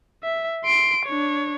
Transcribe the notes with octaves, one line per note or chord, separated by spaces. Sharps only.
E5
C6 D7
D4 C#5